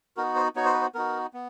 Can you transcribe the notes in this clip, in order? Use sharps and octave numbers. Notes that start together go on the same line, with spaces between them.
B3 D#4 F#4 A#4
C5
B3 D#4 F#4 C#5
C5
B4
C5
B3 D#4 F#4 A#4
B3